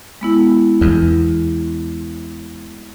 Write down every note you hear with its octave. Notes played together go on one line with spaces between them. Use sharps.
G#3 B3 E4
E2